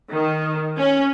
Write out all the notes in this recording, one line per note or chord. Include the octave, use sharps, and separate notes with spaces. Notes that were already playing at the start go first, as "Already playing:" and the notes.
D#3
C#4